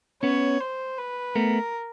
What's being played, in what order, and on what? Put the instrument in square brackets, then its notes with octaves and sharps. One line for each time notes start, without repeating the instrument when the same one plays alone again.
[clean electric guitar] B3 C#4 [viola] C#5
[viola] C5
B4
[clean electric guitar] A3 B3 [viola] A#4